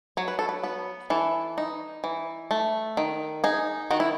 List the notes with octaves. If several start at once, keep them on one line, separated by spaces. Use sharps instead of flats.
F#3 C#5
B4
A4
B4
B3 B4
E3 A4
D#4
E3
A3
D#3
D#4 G#4
D#3 F#4
E4